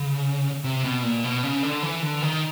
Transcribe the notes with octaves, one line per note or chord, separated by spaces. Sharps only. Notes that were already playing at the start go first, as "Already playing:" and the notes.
Already playing: C#3
C3
B2
A#2
B2
C#3
D3
E3
D3
D#3